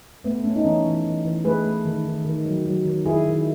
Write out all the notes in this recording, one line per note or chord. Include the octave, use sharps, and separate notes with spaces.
A3 B3
A3 C#4
D#4
E3 C#4
E3
E3
E3
A3 G#4 B4
A3
D#3
D#3
D#3
F#3
F#3
D#3
D#3 E4 G#4
D#3